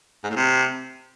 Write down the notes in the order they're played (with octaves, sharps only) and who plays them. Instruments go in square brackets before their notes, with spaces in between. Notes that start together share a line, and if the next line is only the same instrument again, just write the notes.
[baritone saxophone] G#2
A2
C3